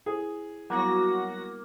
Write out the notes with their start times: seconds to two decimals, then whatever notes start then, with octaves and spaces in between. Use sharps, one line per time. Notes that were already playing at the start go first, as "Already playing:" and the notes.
0.06 E4 G#4 C5 D#6
0.70 F#3 G3 A#3 B3 E4 F#4 A#6